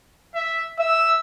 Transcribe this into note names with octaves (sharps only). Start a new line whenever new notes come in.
E5
E5 E6